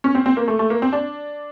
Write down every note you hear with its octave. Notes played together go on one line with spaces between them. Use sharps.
C#4
C4
C4
A#3
A3
A3
A#3
C4
D4